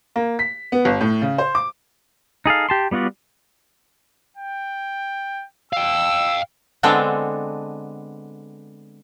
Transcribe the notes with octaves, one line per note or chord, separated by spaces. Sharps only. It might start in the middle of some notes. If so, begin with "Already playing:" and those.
A#3
B6
B3
G1
A2
C#3
C5
D6
D#4 G#4 A4 F5
G4 A5 C6
G3 B3 F4 F#4 D5
G5
F5 G5 E6
D3 G#3 B3 C4 D4 A4